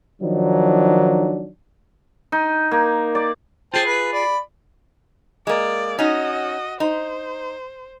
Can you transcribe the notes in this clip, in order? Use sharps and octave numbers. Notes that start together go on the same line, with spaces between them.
D#3 F3 F#3 D4 D#4
D#4
A#3
D5
F4 G#4 C5 G5 A5
B4
D5 B5
G#3 A#3 D5
C#4 D#4 F#4 D#5
D#4 C5